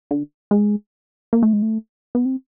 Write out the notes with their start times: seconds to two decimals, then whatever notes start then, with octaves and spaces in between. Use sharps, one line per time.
0.11 D3
0.51 G#3
1.33 A#3
1.43 A3
1.53 G#3
1.62 A3
2.15 B3
2.25 C4